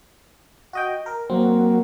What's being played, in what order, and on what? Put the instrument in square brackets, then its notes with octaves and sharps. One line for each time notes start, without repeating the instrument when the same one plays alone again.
[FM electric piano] F#4 D#5 G5
A#4
[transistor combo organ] F#3 A#3 [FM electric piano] C4